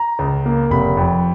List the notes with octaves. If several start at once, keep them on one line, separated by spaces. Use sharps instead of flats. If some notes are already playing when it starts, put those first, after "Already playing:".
Already playing: A#5
C#2
A#3
F1 B5
F2